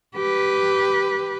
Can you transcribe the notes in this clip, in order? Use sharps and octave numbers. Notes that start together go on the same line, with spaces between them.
G4 B4